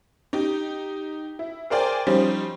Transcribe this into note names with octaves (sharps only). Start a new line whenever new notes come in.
D#4 G4
E4
G#4 A#4 C5 D5 G5 G#5
F3 G3 C#4 D#4 G4 C5